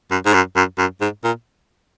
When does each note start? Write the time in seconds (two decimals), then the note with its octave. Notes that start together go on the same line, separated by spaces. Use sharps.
0.11 F#2
0.26 G#2
0.34 F#2
0.56 F#2
0.78 F#2
1.01 G#2
1.24 A#2